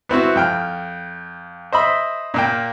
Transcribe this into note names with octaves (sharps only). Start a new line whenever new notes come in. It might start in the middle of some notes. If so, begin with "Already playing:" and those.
B3 C4 E4 F#4
F2 G5 F6
C5 D#5 E5 B5
A#2 A#3 G5